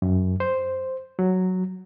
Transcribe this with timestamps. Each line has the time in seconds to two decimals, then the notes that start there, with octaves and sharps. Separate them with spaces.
0.02 F#2
0.40 C5
1.19 F#3